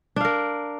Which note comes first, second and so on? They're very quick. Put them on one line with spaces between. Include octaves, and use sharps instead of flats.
D4 F5 A#4